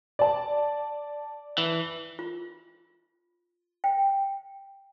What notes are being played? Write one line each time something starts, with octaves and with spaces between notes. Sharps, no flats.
D5 A5
E3
F4
G5